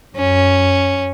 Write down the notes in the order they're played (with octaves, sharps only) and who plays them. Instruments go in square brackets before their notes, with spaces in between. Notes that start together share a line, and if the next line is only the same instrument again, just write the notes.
[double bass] F#2 [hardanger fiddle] C#4